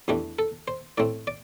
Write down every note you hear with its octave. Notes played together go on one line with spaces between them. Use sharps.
E2 E3 A3 D4 G4
A4
C5
A2 A3 C4 D5
D5